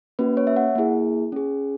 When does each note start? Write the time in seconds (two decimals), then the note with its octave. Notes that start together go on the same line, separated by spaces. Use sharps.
0.19 A#3 C#4 F#4 B4
0.37 C#5
0.47 E5
0.56 F#5
0.75 A#3 E4 G#4
1.32 C#4 G#4